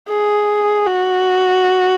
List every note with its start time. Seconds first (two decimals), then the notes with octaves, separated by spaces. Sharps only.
0.09 G#4
0.87 F#4